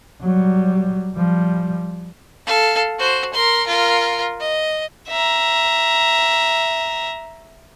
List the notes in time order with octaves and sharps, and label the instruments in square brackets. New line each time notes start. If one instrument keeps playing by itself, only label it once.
[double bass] F#3 G3
F3 G3
[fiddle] A4 F5
F#4 C5
A#4 C6
F4 A#4
D#5
[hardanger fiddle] E5 A#5